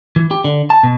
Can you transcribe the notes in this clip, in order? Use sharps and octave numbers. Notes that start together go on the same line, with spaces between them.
E3
G4
D3
A5
B2